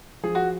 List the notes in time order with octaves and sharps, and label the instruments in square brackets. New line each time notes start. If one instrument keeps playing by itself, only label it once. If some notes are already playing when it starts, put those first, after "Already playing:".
[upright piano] F3 G#4
F#4